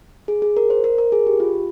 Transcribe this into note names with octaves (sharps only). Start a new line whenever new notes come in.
G#4
G#4
A#4
C5
A#4
A#4
G#4
G4
F4